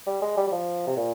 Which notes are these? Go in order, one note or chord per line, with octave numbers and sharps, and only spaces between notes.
G3
G#3
G3
G3
F3
C3
A#2